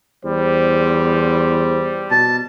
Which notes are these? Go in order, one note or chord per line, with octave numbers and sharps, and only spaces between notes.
E2 G3 C5
B2 A5